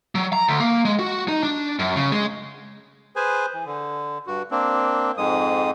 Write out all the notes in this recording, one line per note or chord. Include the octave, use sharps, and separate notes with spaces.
F#3
A#5
D2
A#3
G#3
F#4
D#4
D4
F#2
C#3
G#3
G#4 B4 C5 G#5
E3
D3
G2 F#4
A#3 C4 D4
F2 G#2 G#3 D#6